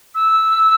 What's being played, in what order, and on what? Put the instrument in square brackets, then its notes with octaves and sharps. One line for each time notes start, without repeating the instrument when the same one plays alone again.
[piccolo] E6